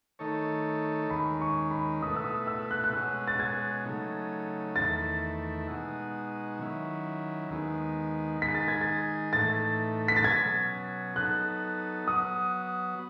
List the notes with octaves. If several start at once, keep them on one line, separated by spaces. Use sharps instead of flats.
D#3 A3 D#4 A4 C#5
D#2 D#3 G#3 C#4 B5
C#6
B5
B2 A3 E4 B4 D#6
E6
D#6
E6
F#6
F#6
B2 G#3 C#4 F#4 E6
A6
G#6
C#3 F#3 A3 D#4
E2 D#3 A3 E4 A6
B2 G#3 D#4 F#4
D#3 F#3 C#4 E4
D#2 D#3 G#3 B3
D#3 G#3 D#4 G#4 B6
A6
G#6
A6
A2 E3 A3 D#4 A6
B6
A6
B2 F#3 C#4 G#6
F#3 B3 D#4 A4 F#6
F#3 B3 F#4 D#6